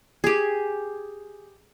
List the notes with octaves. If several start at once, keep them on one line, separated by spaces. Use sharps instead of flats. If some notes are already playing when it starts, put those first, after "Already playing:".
G4 G#4